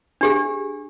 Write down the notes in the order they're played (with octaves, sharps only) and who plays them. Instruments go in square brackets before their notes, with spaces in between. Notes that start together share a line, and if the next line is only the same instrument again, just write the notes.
[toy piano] D4 G4 G#4